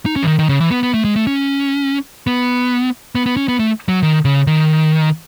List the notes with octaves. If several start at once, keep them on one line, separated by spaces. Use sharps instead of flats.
D#4
C#4
E3
D#3
D#3
C#3
E3
B3
B3
A3
G#3
A3
C#4
B3
B3
B3
C#4
B3
A3
F#3
D#3
C#3
D#3